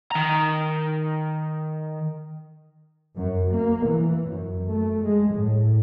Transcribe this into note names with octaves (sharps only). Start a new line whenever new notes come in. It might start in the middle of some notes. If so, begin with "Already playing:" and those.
D#3 A#5
F#2
A#3
E3
F#2
A3
G#3
A2